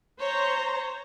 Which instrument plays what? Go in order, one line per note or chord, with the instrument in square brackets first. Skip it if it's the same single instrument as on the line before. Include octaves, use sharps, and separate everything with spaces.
[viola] C5 A#5 [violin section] C#5